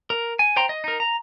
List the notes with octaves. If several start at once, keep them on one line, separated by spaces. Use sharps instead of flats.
A#4
G#5
C5 G5 A#5 C6
D#5
D#4 A#4
A#5